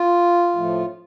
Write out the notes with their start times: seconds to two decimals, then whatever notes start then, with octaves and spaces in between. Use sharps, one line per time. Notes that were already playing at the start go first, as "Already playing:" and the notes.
Already playing: F4
0.56 A2 F3 A3